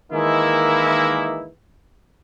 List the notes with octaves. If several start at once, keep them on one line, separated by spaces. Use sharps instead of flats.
D#3 E3 G#3 A#3 D#4 E4